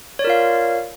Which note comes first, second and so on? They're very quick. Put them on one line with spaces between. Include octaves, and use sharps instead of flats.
C#5 D5 A#4 F4 F5